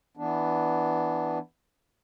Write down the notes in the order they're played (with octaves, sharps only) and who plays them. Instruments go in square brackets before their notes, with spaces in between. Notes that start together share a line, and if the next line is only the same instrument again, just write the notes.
[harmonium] E3 B3 D4